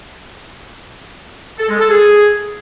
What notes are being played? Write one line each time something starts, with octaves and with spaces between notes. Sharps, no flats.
A4
G#3
A4
G#4